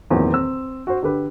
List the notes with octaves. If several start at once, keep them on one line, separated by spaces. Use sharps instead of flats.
E2 A#2 D#3 E3 F#3 C4
C4 E6
F#4 C5
D3 G4 B4